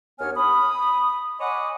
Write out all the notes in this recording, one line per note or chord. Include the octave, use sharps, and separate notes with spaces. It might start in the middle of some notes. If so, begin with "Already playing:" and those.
D#2 B3 D4 C#5 G#5 F6
B5 D#6
C#5 D#5 F#5 G#5 B5 D6